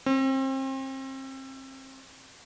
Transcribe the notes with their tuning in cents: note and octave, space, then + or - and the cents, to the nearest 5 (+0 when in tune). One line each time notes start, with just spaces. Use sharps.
C4 +35